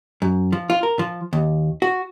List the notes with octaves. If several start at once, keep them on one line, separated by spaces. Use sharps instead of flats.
F#2
F3
F4
A#4
F3
D#2
F#4